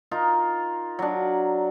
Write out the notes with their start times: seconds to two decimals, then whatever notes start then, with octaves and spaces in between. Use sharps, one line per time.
0.11 D#4 F4 A#4
0.99 F#3 D4